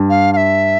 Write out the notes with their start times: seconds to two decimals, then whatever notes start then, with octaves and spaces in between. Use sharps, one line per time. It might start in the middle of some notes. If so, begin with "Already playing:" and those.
Already playing: G2
0.10 F5
0.33 F5
0.37 E5